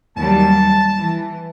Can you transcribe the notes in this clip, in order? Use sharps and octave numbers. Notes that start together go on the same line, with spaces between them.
D#2 F#3 G3 A5
E3